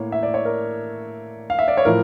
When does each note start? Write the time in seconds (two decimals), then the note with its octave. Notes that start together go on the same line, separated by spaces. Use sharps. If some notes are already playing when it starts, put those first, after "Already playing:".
Already playing: A2 A#3 C#5
0.12 E5
0.23 D5
0.34 C#5
0.45 A#4
1.50 F5
1.59 E5
1.68 D5
1.77 C#5
1.85 A2 F3 A#4